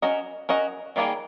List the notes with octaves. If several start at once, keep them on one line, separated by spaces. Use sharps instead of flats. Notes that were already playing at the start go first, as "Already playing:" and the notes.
C#4 F#4 A#4 D#5
C#4 F#4 A#4 D#5
D#3 G3 A#3 D#4 G#4